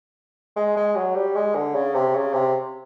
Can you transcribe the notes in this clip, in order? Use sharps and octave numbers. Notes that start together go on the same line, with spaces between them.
G#3
G#3
F#3
G3
G#3
D3
C#3
C3
C#3
C3